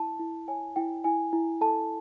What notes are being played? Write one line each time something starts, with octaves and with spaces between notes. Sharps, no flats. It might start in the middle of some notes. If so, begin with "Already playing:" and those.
Already playing: E4 A5
E4
C#5 G#5
E4 G5
E4 G#5
E4
A4 A5